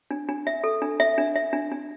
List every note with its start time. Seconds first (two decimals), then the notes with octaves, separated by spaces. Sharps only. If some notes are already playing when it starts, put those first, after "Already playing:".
0.11 D4
0.29 D4
0.47 E5
0.64 A4
0.82 D4
1.00 E5
1.18 D4
1.36 E5
1.53 D4
1.72 D4